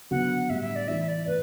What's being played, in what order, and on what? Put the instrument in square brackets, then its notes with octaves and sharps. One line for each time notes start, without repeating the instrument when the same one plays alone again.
[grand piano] D3 F#3 B3 [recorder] F#5
[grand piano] A2 G3 D4 [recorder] E5
[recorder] E5
D5
[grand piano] E3 A3 E4 [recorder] E5
[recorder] D5
[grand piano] A2 [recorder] B4